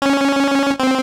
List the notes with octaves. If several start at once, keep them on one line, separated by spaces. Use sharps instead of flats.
C#4
C4